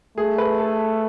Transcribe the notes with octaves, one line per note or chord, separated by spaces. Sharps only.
A3 G#4
B4
A4